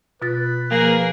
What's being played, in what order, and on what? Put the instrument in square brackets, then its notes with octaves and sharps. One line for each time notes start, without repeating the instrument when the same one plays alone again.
[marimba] B2 F4 A6 [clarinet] B4
[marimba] F3 [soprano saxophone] A#3 [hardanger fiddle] G#4 A#4